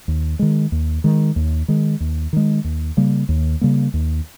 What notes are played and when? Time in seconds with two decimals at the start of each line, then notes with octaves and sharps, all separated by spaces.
0.08 D#2
0.39 D#3 G#3
0.72 D#2
1.04 D#3 G#3
1.36 D#2
1.68 D#3 G#3
2.00 D#2
2.33 D#3 G#3
2.64 D#2
2.97 C#3 G3 A#3
3.29 D#2
3.61 C#3 G3 A#3
3.94 D#2